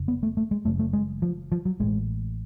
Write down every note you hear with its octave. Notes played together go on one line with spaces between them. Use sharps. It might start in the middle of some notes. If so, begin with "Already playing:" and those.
Already playing: F1 F2 C#3
B3
A3
A3
G#3
F#1 F#2 C#3 A3
A3
G#3
F3
F3
F#3
A1 A2 G#3